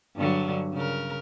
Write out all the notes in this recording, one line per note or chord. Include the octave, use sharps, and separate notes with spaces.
G2 D3 F#3
C#3 A#4